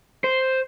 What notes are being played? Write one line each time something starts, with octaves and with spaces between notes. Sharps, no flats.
C5